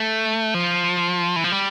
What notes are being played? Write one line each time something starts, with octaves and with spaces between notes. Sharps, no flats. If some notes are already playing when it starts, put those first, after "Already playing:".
Already playing: A3
F3
E3
F3
G3